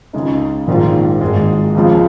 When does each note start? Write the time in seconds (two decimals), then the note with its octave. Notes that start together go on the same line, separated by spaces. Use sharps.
0.13 C#2 C#3 G#3 D#4
0.67 A#1 G#2 D#3 G#3 F4
1.21 G#1 G#2 G#3
1.75 C#2 C#3 F3 G#3